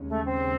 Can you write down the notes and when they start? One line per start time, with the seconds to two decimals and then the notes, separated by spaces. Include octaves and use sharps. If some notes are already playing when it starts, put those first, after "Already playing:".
Already playing: D#2 C#3 G#3 C#4
0.09 A3
0.26 C4